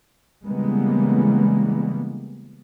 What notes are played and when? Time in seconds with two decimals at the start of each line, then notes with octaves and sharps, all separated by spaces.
0.45 C#3 E3 G3 G#3 A#3 B3